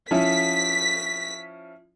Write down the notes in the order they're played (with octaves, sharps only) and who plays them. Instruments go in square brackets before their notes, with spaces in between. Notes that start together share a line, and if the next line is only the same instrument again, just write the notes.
[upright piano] F3 C#4 E4 [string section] B6